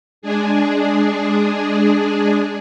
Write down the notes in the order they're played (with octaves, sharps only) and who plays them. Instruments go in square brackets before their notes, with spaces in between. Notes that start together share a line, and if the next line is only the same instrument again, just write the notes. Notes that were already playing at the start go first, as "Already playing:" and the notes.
[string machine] G#3 D4 G#4